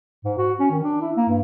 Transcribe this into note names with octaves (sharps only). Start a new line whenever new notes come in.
G#2
F#4
C#4
D#3
D4
E4
A#3
G2